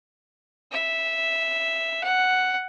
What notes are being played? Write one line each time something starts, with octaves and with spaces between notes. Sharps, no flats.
E5
F#5